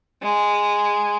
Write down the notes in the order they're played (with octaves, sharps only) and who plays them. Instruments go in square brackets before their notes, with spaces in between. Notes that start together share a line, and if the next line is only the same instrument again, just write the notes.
[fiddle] G#3